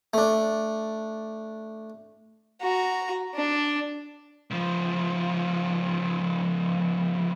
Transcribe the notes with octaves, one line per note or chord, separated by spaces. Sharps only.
A3 D4
F#4 A#5
D4
C#2 F3